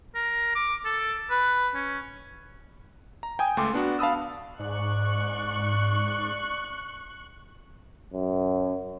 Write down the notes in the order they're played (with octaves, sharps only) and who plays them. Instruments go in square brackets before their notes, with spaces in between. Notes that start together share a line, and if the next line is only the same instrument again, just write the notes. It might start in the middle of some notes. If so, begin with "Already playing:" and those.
[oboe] A#4
D6
A4
B4
C#4
[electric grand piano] A#5
G5 G#5 D#6
C#2 A3 G5 C6 D6
B3 D4 F#4
F5 A5 B5 D#6 E6
[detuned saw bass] G#2 [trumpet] D5 [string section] C#6 F#6
[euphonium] F#2